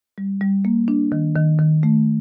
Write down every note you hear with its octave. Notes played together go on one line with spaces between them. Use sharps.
G3
G3
A#3
D4
D#3
D#3
D#3
A3